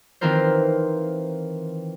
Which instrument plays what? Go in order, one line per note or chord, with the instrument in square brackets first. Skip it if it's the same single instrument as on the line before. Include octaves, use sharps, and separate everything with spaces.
[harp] D#3 E3 C4 F4 A#4 C5